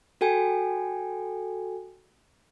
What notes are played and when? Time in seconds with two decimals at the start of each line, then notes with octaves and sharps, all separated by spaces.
0.21 F#4 A4 G5 G#5